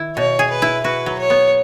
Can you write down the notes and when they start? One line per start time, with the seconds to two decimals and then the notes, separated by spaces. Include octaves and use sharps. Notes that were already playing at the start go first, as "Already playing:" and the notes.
Already playing: D#3 E4
0.16 B2 C#5
0.39 G#4
0.50 B4
0.62 E4
0.84 F#4 B4
1.06 F#3
1.19 C#5
1.30 B3